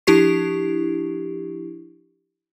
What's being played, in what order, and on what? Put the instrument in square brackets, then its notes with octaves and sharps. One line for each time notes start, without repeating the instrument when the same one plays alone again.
[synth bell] F3 D4 E4 G4 C#6 C7